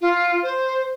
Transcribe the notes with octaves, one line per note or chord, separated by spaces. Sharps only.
F4
C5